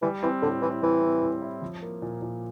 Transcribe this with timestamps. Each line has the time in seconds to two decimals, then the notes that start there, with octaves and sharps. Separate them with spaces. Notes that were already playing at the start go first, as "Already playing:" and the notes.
0.02 E3 G3
0.23 E3 C4
0.42 A2 D3
0.62 E3 E4
0.82 E3 G3
1.02 C4
1.22 A2
1.42 E4
1.62 F3
1.82 A#3
2.02 A#2
2.22 A#2